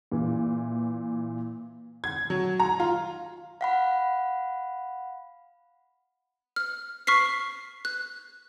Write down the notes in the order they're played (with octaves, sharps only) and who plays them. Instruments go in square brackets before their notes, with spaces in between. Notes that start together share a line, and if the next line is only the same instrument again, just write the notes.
[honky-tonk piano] A#2 E3
G#6
F#3
A#5
F4
[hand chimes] F5 F#5 B5
[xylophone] F6
C#6 F6 B6 C7
F#6